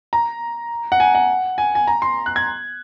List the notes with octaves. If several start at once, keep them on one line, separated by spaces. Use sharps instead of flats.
A#5
F#5
G#5
F#5
G#5
G#5
A#5
C6
F#6
G#6